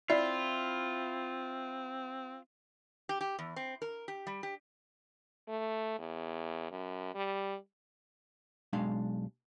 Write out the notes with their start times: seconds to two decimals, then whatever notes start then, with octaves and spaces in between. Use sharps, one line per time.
0.10 C4 E4 F4 D5
3.09 G4
3.21 G4
3.39 E2
3.56 C4
3.82 A#4
4.08 G4
4.27 G3
4.43 G4
5.48 A3
5.99 E2
6.71 F#2
7.15 G3
8.73 B1 G#3 D4 F5